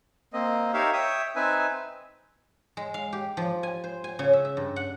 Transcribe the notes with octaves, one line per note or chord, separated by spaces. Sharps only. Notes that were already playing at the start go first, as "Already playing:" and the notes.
A#3 C4 D#5
D#4 G4 A#4 C#5 E5 F5
C#5 E5 G5 D#6
C4 D#4 B4 E5 G#5
G#3
F5
G4
F3
G#5
C5
G#5
C#3
E5
E5
G2
F#5